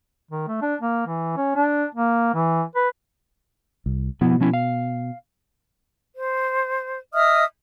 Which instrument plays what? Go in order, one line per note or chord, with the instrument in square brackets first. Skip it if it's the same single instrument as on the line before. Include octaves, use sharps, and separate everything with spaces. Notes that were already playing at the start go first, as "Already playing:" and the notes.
[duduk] D#3
A3
D4
A#3
E3
C#4
D4
A#3
E3
B4
[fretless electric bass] C2
[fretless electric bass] B2 [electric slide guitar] F3 B3 E4
[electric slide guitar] F3 C#4 E4
F5
[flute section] C5
D#5 E5 D#6 F6